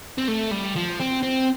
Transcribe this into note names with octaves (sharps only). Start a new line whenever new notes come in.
C4
A3
G3
F3
C4
C4